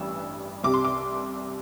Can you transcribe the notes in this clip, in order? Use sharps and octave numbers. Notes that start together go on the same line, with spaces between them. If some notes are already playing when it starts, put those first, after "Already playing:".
Already playing: A1 G2 E3 E6
C2 C3 G3 D6
C6
D6